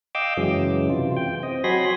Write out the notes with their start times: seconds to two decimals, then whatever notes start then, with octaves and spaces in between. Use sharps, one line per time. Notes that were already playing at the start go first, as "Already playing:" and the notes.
0.15 D#5 F5 G5 D6 E6
0.37 F#2 C#3 E3 F#3 G#3
0.90 C3 E3 F4
1.16 G5
1.43 C4 D#5
1.64 F#3 F#4 G#5 B5 C6 A#6